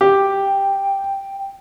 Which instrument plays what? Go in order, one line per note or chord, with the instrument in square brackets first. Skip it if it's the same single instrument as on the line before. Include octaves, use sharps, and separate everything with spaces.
[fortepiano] G4 [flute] G5